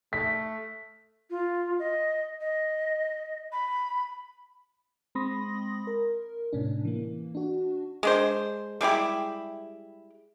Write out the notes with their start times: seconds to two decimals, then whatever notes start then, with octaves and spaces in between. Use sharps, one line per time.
0.13 A3 B6
1.30 F4
1.79 D#5
2.41 D#5
3.52 B5
5.15 G#3 C4 B5 C6 D#6 A#6
5.87 A#4
6.53 A2 C3 C#4 D4
6.85 E3 A#3
7.35 D4 F#4
8.03 G#3 D4 C5
8.81 G3 G#3 E4 G4